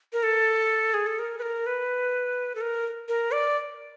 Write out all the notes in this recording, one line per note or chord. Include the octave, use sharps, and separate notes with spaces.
A#4
A4
G#4
A4
A#4
B4
A#4
B4
A4
A#4
A#4
D5